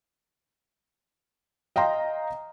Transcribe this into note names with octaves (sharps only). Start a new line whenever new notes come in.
D#5 F5 G5 A#5 C6